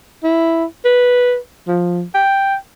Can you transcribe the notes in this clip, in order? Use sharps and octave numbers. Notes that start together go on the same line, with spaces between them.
E4
B4
F3
G5